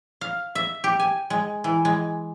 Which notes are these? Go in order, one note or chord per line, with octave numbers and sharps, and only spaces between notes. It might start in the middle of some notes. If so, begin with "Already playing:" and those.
F5
E5
G4
G#5
G#3
E3
G#3